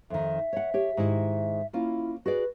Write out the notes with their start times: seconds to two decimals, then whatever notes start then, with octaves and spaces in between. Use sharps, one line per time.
0.10 F2 D#3 E5
0.53 C#5 F#5
0.74 G4 C#5
0.97 G#2 D#3 E4
1.73 A#3 C#4 E4 F4
2.26 F#4 G#4 B4 D5